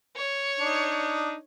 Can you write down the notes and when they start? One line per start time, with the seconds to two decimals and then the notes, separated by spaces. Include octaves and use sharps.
0.17 C#5
0.59 D4 D#4